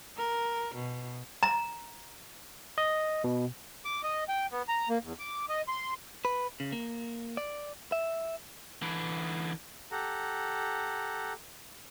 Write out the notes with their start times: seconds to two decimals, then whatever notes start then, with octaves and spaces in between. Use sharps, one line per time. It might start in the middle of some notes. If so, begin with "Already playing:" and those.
0.17 A#4
0.75 B2
1.43 A#5
2.78 D#5
3.24 B2
3.85 D6
4.03 D#5
4.28 G5
4.51 B3
4.69 A#5
4.89 A#3
5.04 E2
5.19 D6
5.49 D#5
5.68 C6
6.25 B4
6.60 C#3
6.72 A#3
7.37 D5
7.92 E5
8.82 D3 E3
9.91 G4 A4 F#5 A#5